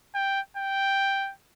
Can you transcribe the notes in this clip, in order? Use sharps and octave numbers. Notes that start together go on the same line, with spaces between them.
G5
G5